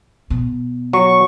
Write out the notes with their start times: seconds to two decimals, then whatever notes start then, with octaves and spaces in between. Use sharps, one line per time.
0.30 B2
0.93 F#3 C#6